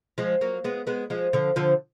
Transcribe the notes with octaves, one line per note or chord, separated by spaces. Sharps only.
F3 G#3
F#3 A#3
G#3 B3
G#3 B3
F3 G#3
D3 F3
D3 F3